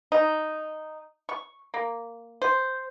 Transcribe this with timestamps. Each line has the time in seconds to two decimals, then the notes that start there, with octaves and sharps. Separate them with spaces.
0.12 D#4
1.29 C#6
1.74 A#3
2.42 C5